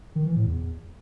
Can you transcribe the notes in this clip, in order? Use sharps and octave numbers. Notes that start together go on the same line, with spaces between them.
D#3
E3
A2
E2